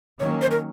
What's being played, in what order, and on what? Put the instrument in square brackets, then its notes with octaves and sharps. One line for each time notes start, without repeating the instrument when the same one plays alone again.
[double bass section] D#3 F#3 A#3 C#4 [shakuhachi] C#5
[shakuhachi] C5
A#4